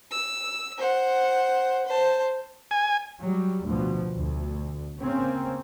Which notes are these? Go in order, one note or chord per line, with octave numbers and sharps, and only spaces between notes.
E6
C5 F#5
C5 A5
G#5
F#3 G3
D2 B2 F3
D2
C#3 A#3 C4 C#4